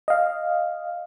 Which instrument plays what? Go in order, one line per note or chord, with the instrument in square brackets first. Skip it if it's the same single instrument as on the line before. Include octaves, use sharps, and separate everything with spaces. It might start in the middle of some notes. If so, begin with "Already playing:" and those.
[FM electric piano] D#5 F5